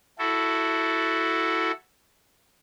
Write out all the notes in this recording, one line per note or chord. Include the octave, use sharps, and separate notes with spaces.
E4 F#4 A4